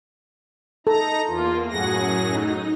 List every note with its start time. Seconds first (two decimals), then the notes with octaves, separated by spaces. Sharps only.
0.87 D#4 A4 A#5
1.27 E2 A#3 F4
1.70 F#2 A2 F#3 G#4 F#5 A#6
2.27 D#4